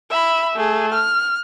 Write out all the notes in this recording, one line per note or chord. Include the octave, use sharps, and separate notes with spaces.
E5 B5
A3 G#4
F6